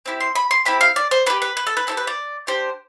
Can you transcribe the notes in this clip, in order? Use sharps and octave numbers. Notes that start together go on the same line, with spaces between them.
C4 E4 G4
C6
B5
C6
C4 E4 G4 B5
F5
D5
C5
D4 G4 B4
B4
B4
A4
B4
C4 E4 G4 A4
B4
D5
D4 G4 C5